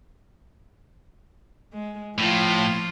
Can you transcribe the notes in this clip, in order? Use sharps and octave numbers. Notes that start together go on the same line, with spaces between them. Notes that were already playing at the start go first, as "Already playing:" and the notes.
G#3
A2 F3 F4